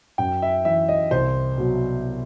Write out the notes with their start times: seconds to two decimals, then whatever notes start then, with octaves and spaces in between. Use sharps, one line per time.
0.18 F#2 G5
0.42 E5
0.65 E3 E5
0.89 D#5
1.11 C2 C5
1.58 B2 F#3